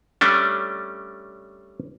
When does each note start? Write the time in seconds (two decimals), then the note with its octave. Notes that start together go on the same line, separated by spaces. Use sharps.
0.21 G3 A3 C#4 D4